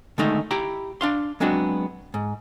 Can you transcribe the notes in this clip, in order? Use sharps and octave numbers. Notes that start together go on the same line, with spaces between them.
D3 D#3 G#3 A3 D#4
E4 G4 G5 A#5 B5
D4 F5 C6
F#3 G#3 B3 C4 D4 F#4
G#2